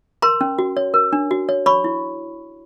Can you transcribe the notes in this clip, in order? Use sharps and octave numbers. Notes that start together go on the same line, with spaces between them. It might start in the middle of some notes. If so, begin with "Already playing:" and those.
A#4 A#5 C6
C#4
F#4
C#5
A#4
D4
F#4
C#5
C#5 B5 C#6
E4